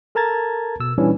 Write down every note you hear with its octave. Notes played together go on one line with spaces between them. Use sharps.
A4 A#4 A5 A#5 G#6 A6
B2 E6
A#2 E3 G3 C#4 D4 E4